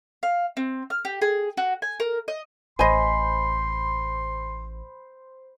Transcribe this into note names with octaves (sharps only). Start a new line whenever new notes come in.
F5
C4
F6
G4
G#4
F#4
G#5
A#4
D#5
A1 C5 D#5 G#5 B5 C6